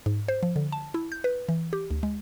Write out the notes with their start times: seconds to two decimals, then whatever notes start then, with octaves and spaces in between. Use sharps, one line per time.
0.06 G#2
0.28 C5
0.43 F3
0.56 D3
0.72 A5
0.94 E4
1.12 G6
1.24 B4
1.49 E3
1.73 G4
1.91 D2
2.03 G#3